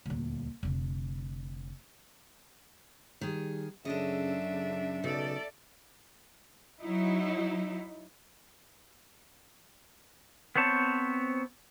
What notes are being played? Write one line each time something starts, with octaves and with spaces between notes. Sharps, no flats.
D#1 D2
F1 D3
D#3 G3 G#4
F#2 C#3 D4 A4 D#5 E5
C#3
B1 C#3 A4 D5
F#3 D#4 E4
B3 C4 C5 C#5 A5